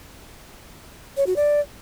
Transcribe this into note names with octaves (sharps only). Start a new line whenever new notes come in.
C#5
F#4
D5